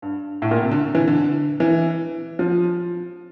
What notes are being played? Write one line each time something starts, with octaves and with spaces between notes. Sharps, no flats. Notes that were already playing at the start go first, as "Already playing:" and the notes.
G2
A2
A#2
C3
D3
E3
D3
E3
F3